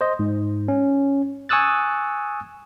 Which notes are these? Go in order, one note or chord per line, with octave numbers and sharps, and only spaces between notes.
C5 D#5
G#2
C#4
G#5 C#6 D#6 E6 F#6 A6